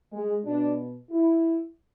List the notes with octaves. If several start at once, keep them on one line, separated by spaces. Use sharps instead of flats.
G#3
B2 D4
E4